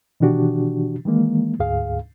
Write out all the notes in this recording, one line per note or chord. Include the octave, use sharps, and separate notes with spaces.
B2 D#3 E3 D4 F#4 G4
D#3 E3 G#3 A#3
D2 G#2 G#4 F5